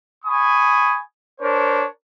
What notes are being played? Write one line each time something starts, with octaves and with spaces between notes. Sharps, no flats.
G#5 B5 C#6 D#6
D4 A#4 C5 C#5